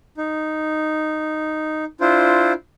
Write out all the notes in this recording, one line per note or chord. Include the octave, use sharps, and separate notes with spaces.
D#4
D4 E4 F4 C5